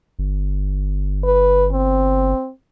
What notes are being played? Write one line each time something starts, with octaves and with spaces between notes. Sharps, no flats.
G1
B4
C4